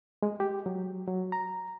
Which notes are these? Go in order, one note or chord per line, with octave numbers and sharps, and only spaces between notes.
G#3
G4
F#3
F#3
A#5